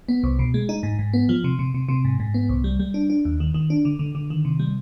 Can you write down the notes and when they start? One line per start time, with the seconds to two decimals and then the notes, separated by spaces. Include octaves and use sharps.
0.08 B3
0.23 C2
0.39 B2
0.54 G#3
0.69 D#4
0.83 G#2
0.99 G#2
1.13 B3
1.29 F3
1.44 C3
1.59 C3
1.74 C3
1.89 C3
2.05 G#2
2.20 G#2
2.34 B3
2.49 C2
2.64 G3
2.79 G3
2.94 D4
3.10 D4
3.25 D#2
3.40 D#3
3.54 D#3
3.70 D4
3.85 D3
3.99 D3
4.15 D3
4.30 D#3
4.45 C3
4.60 G3